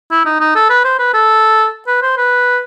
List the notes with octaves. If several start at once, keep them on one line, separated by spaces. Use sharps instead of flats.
E4
D#4
D#4
A4
B4
C5
B4
A4
B4
C5
B4